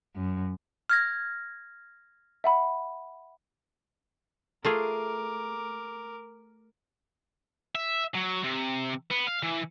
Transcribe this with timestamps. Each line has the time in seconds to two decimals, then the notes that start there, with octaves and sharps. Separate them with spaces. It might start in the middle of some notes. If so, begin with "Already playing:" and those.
0.15 F#2
0.90 F6 G#6 A#6
2.44 E5 F#5 B5
4.65 A3 F4 G#4 A#4 D6
7.75 E5
8.15 F#3
8.44 C3
9.11 B3
9.27 F5
9.43 E3